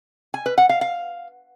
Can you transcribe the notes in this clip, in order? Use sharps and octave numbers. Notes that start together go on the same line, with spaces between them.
G#5
B4
F#5
F5
F5